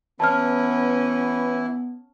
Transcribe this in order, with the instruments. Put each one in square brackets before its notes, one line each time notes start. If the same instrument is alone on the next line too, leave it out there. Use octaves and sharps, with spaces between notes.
[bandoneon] E3 E4 [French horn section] B3 [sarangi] C#4 [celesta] A5 F6